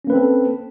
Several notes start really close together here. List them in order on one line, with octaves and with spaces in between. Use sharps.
C#4 A#3 B4 C4 A4